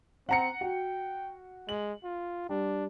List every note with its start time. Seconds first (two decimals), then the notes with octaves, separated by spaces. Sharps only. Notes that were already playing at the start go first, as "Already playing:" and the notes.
0.29 C4 F#5 A#5 C#7
0.61 F#4 G5
1.69 G#3 F#7
2.04 F4
2.49 G3 D4